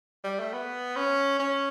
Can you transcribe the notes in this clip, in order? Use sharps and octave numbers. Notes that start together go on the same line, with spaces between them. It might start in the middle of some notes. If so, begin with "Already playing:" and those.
G3
A3
B3
C#4
C#4